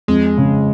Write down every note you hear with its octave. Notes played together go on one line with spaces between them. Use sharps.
F2 G#3
C#3